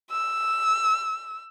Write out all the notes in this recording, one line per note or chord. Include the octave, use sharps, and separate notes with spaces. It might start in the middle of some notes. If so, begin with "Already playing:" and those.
E6